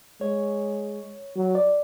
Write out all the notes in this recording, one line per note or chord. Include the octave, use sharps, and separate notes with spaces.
G#3 C#5
F#3
D5